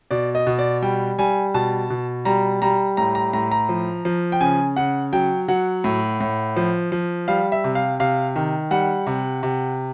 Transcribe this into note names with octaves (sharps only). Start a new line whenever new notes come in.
B2 D5
D#5
B2
D5
G3 G5
G3 G#5
B2 A5
B2
G3 A#5
G3 A#5
A2 A#5
A#5
A2 A#5
A#5
F3
F3
G5
C#3 G#5
C#3 F#5
F#3 G5
F#3 F#5
A2
A2
F3
F3
G3 F5
E5
C3
F5
C3 F5
D#3
G3 F#5
C3
C3